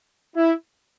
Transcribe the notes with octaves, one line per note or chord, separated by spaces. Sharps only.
E4